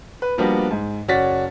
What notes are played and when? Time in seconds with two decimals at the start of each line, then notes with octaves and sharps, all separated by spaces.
0.22 B4
0.38 F3 G3 A#3 B3 D4 F#4
0.71 G#2
1.08 F#1 C#4 F#4 D5 A6 B6